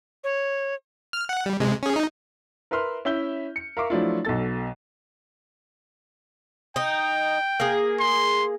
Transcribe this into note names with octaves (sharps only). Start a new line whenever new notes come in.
C#5
F6
F#5
G3
C3 G#3
C#4 G#4
D#4
A#4 B4 E5 C6 F6
C#4 E4 E5 G6 G7
C#7
A#4 E5 F5 C#6 D6
F3 F#3 A3 D4 E4 F4
B1 B2 A4 A6
D#4 G5
A#3 G#4
C6